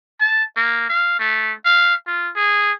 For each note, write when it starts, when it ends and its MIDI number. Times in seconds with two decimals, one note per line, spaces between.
0.21 0.43 81
0.56 0.88 58
0.89 1.19 77
1.19 1.52 57
1.65 1.94 77
2.07 2.29 65
2.36 2.72 68